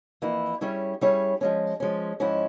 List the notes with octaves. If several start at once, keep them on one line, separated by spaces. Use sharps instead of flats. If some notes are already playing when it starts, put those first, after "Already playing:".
F2 E3 A#3 E4
G3 C#4 E4 G#4 C#5
G3 C#4 E4 G#4 C#5
F3 G#3 C#4
F3 G#3 C#4
G#2 F3 G#3 C#4 E4